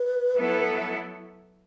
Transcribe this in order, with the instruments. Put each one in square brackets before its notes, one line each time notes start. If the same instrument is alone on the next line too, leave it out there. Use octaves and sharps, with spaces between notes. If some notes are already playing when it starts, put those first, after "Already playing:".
Already playing: [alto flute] B4
[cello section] F#3 B3 E4 A4